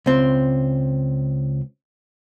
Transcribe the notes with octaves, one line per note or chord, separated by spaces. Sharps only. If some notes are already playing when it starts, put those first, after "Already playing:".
C#2 C4